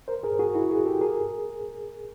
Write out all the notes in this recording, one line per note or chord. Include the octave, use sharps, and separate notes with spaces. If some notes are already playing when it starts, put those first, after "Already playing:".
A#4 C5
G#4 A#4
F#4 G#4
E4 F#4
F#4 G#4
G4 A4
G#4 A#4